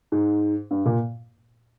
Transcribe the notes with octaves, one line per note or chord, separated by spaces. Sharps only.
G#2
G2
A#2